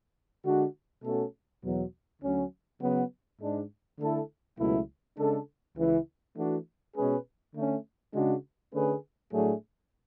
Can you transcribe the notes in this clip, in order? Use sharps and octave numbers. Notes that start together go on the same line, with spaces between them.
D3 G#3 D4 F#4
B2 A3 C#4 F#4 A4
E2 B2 F#3
D2 D3 F#3 C#4
C#3 F#3 B3
G#2 G#3 D4
D3 A3 E4 A4
C#2 B2 F#3 A3 E4
C#3 G#3 D4 A4
C#2 C#3 E3
E3 A3 D4 F#4
B2 G#3 C#4 G#4 B4
D3 A3 C#4
C#3 G#3 D4 F#4
D3 A3 C#4 G#4 B4
A2 F#3 A3 D4 G#4